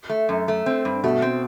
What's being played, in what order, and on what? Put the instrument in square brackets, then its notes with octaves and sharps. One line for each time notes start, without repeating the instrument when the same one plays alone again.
[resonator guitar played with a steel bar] A3
F#2
A3
C4
G2
[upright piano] B2 [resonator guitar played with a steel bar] A3
[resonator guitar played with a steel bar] C4